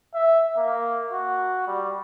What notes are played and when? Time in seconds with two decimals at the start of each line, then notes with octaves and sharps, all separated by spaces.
0.15 E5
0.57 A#3
1.12 F#4
1.68 G3